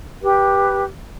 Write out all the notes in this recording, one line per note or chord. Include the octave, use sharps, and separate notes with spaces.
G4 B4